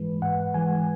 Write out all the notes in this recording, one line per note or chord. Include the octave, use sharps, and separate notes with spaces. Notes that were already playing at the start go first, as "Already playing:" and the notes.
Already playing: G#2 E3 G#3 B4
G#2 F#5
E3 G#3 G#5